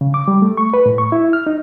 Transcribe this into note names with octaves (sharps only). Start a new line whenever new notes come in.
C#3
D6
G3
A3
C#6
B4
A2
C#6
E4
F6
D#4